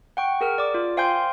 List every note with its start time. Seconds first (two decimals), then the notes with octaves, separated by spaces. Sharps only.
0.17 F#5 G5 C#6
0.41 G#4 A#4 F6
0.58 D5 D6
0.74 F4
0.97 C5 F5 G5 G#5 C6 G6